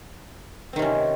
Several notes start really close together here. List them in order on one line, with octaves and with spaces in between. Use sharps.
C4 D#3 C3 C#4